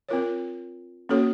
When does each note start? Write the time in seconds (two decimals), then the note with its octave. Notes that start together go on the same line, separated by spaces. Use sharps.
0.09 C4 F4 A#4 C#5
1.09 A#3 C#4 F#4 A4 C#5